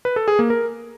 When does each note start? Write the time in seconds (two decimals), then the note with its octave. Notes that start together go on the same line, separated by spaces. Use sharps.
0.05 B4
0.16 A4
0.28 G#4
0.39 A#3
0.50 A#4